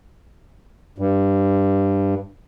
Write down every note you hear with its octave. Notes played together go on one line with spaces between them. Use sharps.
G2